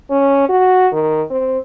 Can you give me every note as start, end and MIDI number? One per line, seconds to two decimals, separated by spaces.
0.11 0.47 61
0.49 0.87 66
0.92 1.22 51
1.30 1.58 60